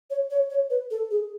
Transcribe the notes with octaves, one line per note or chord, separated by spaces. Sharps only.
C#5
C#5
C#5
B4
A4
G#4